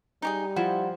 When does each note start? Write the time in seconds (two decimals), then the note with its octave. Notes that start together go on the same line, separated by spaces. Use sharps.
0.22 G3 D#4 G4 G#4
0.56 F3 E4 C5 F#5